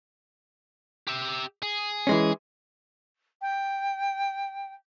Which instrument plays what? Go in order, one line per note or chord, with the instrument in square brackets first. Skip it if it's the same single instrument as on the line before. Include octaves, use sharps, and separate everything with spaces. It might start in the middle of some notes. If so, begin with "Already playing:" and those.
[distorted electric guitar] G4 E5
G#4
[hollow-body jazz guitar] E3 G#3 C#4
[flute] G5